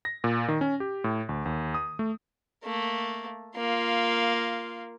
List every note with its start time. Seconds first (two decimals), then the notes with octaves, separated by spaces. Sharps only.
0.05 A#6
0.24 A#2
0.48 D#3
0.61 C#4
0.80 G4
1.04 A2
1.29 D2
1.46 D#2
1.74 D#6
1.99 A3
2.64 A3 A#3
3.56 A#3 F4